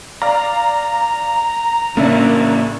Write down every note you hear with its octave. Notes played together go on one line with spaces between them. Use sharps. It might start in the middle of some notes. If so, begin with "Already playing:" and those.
D5 F5 A#5
A1 C#3 A#3 D4 A#4 E5